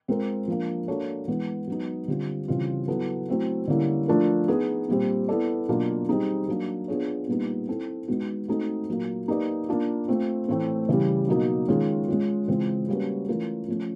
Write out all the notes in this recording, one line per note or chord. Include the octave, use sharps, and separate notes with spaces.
G#3 C4 F4 A#4
F3 A#3 D4
A#3 D4 F#4 A4 C#5
E3 G#3 B3
F#3 B3 D#4
D3 G3 C4 F4
C#3 E3 G3 C4 F4
F#3 B3 E4 A4
F#3 A3 C4 E4
D3 G3 A#3 C#4 E4
F3 A3 D4 F4 A#4
B3 D#4 G#4 B4
A#2 G3 C4
B3 E4 A4 D5
B2 F#3 A#3 D4 F4
G3 C4 D#4 G#4
F#3 A#3 D4
B3 D4 F4 G#4 C#5
A#2 G3 B3 D#4
C4 E4 A4
G#3 B3 D#4 F#4
A3 C4 D#4 F#4 A4
A#2 F#3 A#3
A#3 D#4 G4 B4 D5
A#3 D4 F4
A3 C4 F4
A2 E3 A3 C4
C#3 E3 G3
B2 F#3 A#3 D#4
D#3 G#3 C#4 F4 G#4
G#3 C#4 F4
C#3 E3 G#3 C4 F4
G3 A#3 C#4 F#4 B4
E3 A3 C#4 F4 A#4
F3 A3 C#4